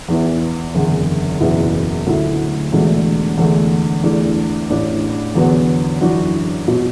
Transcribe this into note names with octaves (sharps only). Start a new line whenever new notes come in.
E2 E3 B3 E4
F#1 E2 D3
F#1 E2 B2 B3 E4
D2 D3 F#3 A3 E4
E1 E2 B2 A3 D4
E2 D3 A3
E2 E3 A3 D4
A1 A2 E3 D4
E2 D3 F#3 B3
F#2 E3 D4 F#4
B2 F#3